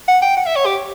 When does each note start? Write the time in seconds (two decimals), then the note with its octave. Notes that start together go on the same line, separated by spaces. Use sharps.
0.08 F#5
0.22 G5
0.37 F#5
0.46 E5
0.56 C#5
0.66 G4